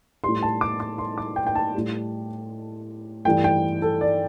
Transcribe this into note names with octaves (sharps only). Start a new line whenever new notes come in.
A2 G3 C6
A5
D6
D6
C6
D6
G5
G5
A5
A2 G3
G2 E3 A3 G5
G5
A4
D5